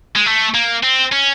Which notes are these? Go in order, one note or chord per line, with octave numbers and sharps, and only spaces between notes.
G#3
A3
A#3
C4
C#4